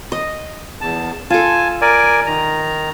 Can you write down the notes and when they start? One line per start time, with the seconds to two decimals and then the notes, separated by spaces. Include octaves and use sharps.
0.12 D#5
0.81 E2 A5
1.30 F4 A4 G#5 A5
1.81 A#4 D5 G#5
2.26 D#3 A#5